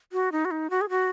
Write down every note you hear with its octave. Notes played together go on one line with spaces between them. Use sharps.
F#4
D#4
F#4
D#4
F#4
G#4
F#4